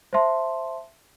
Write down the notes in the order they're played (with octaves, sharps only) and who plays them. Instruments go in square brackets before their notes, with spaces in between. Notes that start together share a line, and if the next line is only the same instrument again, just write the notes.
[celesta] C5 E5 A5 C6